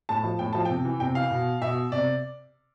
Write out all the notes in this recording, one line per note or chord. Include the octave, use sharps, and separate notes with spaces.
A2 A5
F3
A2 G5
F3 A5
C3 G5
E3
C3 G5
E3 F5
B2
B2 E5
C3 D5